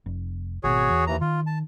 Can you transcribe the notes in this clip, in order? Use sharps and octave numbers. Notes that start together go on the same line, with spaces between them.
F1
G#1 B2 F#4 G#4 C#5
E2
D#2 E3 A#5
D#3 F4
A5